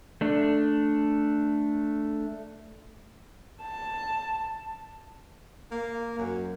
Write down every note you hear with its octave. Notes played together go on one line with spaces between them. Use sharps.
A3 D4
A5
A#3
F#2